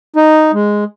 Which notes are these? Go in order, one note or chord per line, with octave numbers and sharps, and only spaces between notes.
D#4
G#3